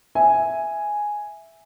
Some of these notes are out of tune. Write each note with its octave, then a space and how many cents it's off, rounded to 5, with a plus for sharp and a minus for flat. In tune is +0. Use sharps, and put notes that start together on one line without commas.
E5 +0 G#5 +0